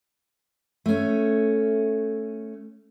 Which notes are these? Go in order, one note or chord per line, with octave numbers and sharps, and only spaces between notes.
A3 C#4